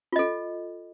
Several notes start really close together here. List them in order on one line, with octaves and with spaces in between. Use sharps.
F4 D#5 A4